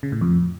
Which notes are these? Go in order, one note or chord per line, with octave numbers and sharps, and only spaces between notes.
C#3
A2
F2